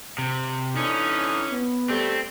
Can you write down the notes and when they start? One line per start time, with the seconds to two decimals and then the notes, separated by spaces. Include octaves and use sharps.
0.18 C3
0.77 D3 E3 C#4 D#4
1.51 B3
1.90 G3 A3 C4